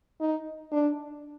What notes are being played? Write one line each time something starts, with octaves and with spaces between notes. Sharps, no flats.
D#4
D4